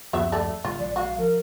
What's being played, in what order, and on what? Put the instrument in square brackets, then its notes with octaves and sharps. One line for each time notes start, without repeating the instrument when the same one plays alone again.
[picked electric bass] D1 F#2 F3 [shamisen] F#3 B3 E5
[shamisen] G3 A3 A4
[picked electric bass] A2 C#3 G3 [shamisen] F4
[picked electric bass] A#1 E3 G#3 [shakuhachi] D5
[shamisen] F#4 [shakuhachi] F5
[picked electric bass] F3 [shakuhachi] A#4